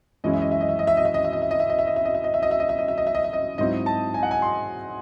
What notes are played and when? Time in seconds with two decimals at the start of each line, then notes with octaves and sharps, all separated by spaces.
0.24 F#2 E3 G#3 C#4 E4 D#5
0.34 E5
0.41 D#5
0.52 E5
0.61 D#5
0.69 E5
0.79 D#5
0.87 E5
0.97 D#5
1.05 E5
1.14 D#5
1.25 E5
1.33 D#5
1.42 E5
1.51 D#5
1.60 E5
1.70 D#5
1.79 E5
1.87 D#5
1.96 E5
2.05 D#5
2.15 E5
2.24 D#5
2.34 E5
2.43 D#5
2.51 E5
2.60 D#5
2.69 E5
2.79 D#5
2.88 E5
2.98 D#5
3.07 E5
3.15 D#5
3.24 E5
3.33 D#5
3.58 G#2 F#3 C4 E4 D#5
3.86 A5
4.14 G#5
4.23 F#5
4.31 G#5
4.42 C6